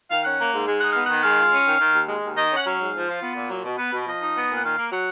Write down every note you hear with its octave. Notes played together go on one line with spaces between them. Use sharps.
D#3 F5
C#4 F#5
A#3
G#2
G#3
D#4 F#5
B3 F5
D#3 F#5
G#3 F5
F4
C#4
D#3
D#3
D#2
G#3
D#2
D#3 D#5
C#4
F#5
F#3 F5
G#2
F3
F4
B3
A#2
F#3
B2
B3 B4
B2
F3 D#5
D#4
B3
A#2
F#5
D#3 F5
A#3
F#3 F#5